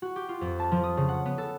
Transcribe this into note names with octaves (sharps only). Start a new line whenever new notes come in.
F#4
G4
F4
F2
A5
F3
D#6
C#3
F#5
B3
A4